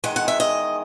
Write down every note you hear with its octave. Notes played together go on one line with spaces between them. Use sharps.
E2 D#3 G#3 F#5
F#5
E5
D#5